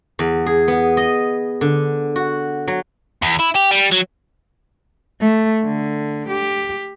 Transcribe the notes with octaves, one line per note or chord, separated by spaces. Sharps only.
E2
G#4
B3
D#5
D3
F#4
F#3
E2
E4
G4
G3
F#3
A3
D3
G4